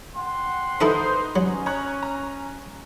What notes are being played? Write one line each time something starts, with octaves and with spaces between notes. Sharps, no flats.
F#5 G5 C6
D#4 E4 A4 B4 C5 E5 D#6
F#3 C#4
C#5 A#5 F#6
A#5